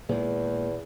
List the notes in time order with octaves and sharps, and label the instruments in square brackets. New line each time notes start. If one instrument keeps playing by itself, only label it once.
[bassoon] E2 [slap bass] A#2 D#3 G#3